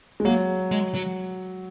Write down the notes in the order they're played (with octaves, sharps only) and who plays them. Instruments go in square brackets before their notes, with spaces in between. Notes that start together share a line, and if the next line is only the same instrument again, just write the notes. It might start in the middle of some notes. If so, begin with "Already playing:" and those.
[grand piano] G#3
[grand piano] F#3 [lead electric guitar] A#3
[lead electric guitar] G#3
F#3